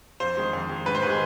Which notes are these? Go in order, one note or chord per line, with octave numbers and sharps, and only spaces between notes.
F2 C5
D#3 G#3
F2
D#3 G#3
G#2 B4
C5
D#3 G#3 G#4 B4